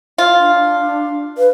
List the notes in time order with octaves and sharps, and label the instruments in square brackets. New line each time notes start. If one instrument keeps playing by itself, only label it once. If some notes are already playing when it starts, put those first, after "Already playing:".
[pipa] F4
[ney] D4
[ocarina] B4 [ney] F5